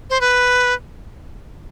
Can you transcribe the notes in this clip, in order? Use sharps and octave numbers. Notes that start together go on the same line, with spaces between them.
C5
B4